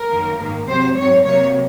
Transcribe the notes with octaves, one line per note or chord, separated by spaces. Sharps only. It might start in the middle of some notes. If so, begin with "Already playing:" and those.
Already playing: A#4
F#2 D#3 A#3
G#2 D#3 A#3
C3 F#3 C4 C5
G#2 F#3 C4 C#5
C3 F#3 A#3 C#5